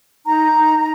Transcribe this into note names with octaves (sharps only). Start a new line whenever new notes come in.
D#4 A#5
D#4
D#4